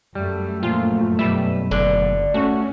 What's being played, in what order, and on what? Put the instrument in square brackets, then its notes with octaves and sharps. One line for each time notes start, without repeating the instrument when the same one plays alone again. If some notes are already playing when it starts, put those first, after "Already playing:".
[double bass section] F#2 A3 [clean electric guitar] G3
[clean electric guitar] A#2 F3 [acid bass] F4
[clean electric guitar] B1 B4 E5 [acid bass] G3
[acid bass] F#1 [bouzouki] D3
[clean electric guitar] A3 [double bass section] C#4 [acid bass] F#4